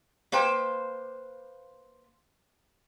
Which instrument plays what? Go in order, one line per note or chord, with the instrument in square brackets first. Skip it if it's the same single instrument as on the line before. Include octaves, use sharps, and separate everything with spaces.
[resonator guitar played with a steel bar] A#3 B4 C5 G5